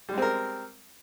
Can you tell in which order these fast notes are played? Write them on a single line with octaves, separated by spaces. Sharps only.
G3 G#3 C4 A#4